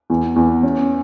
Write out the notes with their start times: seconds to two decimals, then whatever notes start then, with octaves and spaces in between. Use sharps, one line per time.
0.10 E2
0.36 E2
0.63 C#4